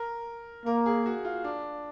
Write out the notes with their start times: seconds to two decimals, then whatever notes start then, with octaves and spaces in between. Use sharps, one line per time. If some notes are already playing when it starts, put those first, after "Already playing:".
Already playing: A#4
0.66 A#3 A#4
0.86 G#4
1.06 F#4
1.25 F4
1.44 D4